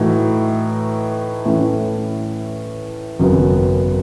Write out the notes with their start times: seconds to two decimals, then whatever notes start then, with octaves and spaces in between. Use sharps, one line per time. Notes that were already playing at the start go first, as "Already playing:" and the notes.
Already playing: A2 E3 A3 D#4 F#4
1.45 A2 E3 A3 C#4
3.19 G#1 F#2 C#3 F#3 B3